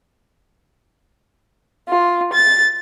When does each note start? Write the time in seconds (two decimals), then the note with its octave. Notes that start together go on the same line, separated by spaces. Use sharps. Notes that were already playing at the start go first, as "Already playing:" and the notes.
1.87 F4
2.33 A6